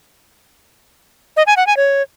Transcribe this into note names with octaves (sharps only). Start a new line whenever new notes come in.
D#5
G#5
F#5
G#5
C#5